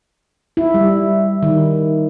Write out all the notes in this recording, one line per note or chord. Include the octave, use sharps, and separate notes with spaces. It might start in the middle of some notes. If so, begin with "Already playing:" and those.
E4
G3
D#3